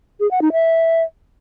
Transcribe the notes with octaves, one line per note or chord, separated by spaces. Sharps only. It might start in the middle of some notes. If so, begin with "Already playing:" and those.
G#4
F#5
D#4
E5